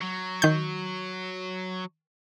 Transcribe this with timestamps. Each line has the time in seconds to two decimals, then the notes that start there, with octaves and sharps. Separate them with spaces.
0.02 F#3
0.42 D#3 G6